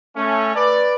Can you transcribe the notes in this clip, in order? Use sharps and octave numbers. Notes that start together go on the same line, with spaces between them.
A3 C#4
B4 D5